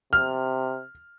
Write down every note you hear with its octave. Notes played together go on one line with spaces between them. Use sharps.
C3 F6